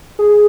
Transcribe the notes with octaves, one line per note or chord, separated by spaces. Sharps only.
G#4